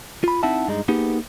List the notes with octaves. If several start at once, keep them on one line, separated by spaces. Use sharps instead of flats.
F4 B5
C4 D#4 E4 E5 F#5 A5
G2 G#3 D#4
A#3 B3 D#4 G4 G#4